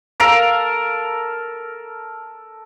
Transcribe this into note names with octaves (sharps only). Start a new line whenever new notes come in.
A4 A#4 F5